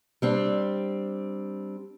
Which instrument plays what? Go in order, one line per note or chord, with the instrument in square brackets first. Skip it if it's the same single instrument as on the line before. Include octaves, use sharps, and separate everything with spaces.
[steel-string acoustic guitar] G3 C4 D4